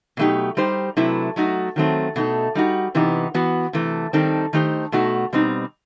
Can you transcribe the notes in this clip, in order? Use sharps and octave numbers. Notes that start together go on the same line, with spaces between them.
B2 F#3 A3 D#4 G4
G3 D#4 G4 C5
C3 F#3 A3 E4 B4
F#3 A3 D#4 F#4
D#3 F#3 A3 C4
B2 A3 D#4 A4
G3 D#4 F#4
C3 E3 B3 D#4 G4
E3 B3 F#4
C3 E3 A3
D#3 G3 C4 D#4 A4
D#3 A3 D#4 G4 C5
B2 A3 D#4 F#4
B2 G3 C4 D#4